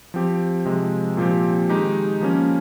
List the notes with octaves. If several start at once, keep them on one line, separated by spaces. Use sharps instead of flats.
F3 C4 G4
C3 F3 G#3
A#2 F3 C4 G4
D#3 G#3 D#4 G4
F3 A#3 C#4